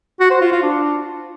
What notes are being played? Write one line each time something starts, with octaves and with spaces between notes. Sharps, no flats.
F#4
C5
F4
F4
D4